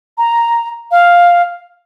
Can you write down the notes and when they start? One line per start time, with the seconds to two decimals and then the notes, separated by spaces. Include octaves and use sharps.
0.18 A#5
0.91 F5